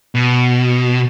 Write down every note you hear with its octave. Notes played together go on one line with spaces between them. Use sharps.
B2